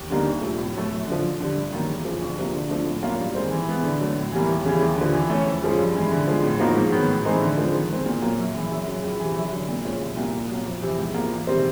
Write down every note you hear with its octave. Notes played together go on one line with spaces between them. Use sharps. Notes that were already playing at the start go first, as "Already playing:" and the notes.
Already playing: D#2
D3 G3 A#3 D#4
D2
C3 F3 A3
A2
F#3 A3
F#2
D3 F3
F#2
D3 G3
G2
D#3 F#3 A#3
E2
C#3 F3
D2
C3 F3 A#3
D3
F3 A3 D4
A2
F#3 A#3 C#4 F4
G2
D#3 G#3 C4
E3
G#3 B3
D3
F#3 A3
A2
E3 G3 A#3
D#2
C#3 E3 G3
D#2
D3 F3
E3
A3 C#4
F2
C#3 F3 G#3 C#4
G2
E3 G#3
D3
F3 G#3
A2
F3 A#3 D#4 F#4
G#2
D#3 F#3 B3
A2
E3 G#3 C4 D#4
D3
F3 G#3 C4
D#3
G#3 C4
A#2
F#3 A#3
F#2
C#3 E3
F#2
C#3 F#3
C#2
C3 E3
F#2
D3 F#3
A#2
F3 G#3 C#4
C2
A#2 G3 A#3
A#2
F#3 A#3
F2
C3 E3
G#2
F3 A#3
E2
C3 D#3 G3 C4